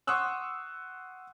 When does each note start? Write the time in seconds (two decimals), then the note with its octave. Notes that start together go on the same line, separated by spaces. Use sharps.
0.07 F#5 C6 C#6 D#6 E6 F#6